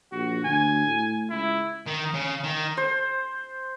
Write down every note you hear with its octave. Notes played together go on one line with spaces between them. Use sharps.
A#1 F#4
D2 G#5
A2
C#2 E4
D#3
C#3
D#3
C5